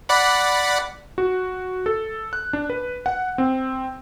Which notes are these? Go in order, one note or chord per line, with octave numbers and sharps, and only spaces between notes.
D5 F#5 B5
F#4
A4
F#6
D4
B4
F#5
C4